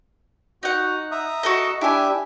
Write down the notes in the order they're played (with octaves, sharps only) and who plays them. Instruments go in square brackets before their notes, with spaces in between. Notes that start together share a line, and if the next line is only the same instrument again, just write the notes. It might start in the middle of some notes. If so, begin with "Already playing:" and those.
[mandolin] D#4 F#5 [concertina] F#4
[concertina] E5 A#5 D#6
[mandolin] F#4 A4 D#5
[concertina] D4 G4 E5 [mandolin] E4 G#5